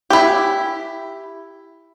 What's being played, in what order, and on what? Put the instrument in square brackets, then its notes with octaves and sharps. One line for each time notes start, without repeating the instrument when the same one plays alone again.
[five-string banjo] E4 G4